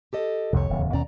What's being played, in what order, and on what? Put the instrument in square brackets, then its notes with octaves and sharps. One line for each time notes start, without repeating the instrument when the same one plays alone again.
[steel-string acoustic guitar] G4 A4 D#5
[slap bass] C2 F2 C3 [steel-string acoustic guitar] D#3 C#5
[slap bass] D1 E2 C#3
[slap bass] D#2 B2 C#4 [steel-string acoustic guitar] D5 A#5